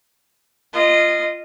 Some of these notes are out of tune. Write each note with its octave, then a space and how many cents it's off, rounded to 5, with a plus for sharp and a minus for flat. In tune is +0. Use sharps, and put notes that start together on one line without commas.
F4 -15 D#5 -15